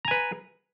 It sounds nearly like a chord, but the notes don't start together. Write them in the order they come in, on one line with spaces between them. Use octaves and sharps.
A#5 G#5 B4